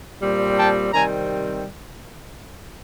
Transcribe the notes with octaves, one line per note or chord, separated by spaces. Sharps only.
A#2 G3 C4
G5 A5
C3 D#3 G3 C4 G#5 A#5